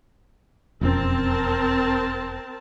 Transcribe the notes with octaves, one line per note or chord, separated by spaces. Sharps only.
E1 F2 C4 C#4 A#4 A5